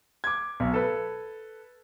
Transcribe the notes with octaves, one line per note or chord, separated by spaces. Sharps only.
D6 G#6
B1
A4 B4